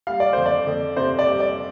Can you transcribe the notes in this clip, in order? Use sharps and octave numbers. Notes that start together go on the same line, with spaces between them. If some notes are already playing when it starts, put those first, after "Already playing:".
G3 F5
D5
F2 C5
D5
F2
C3 C5
D5
G3
D5